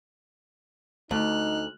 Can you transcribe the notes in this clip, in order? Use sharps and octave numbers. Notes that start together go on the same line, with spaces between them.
D2 A3 D#4 F6 F#6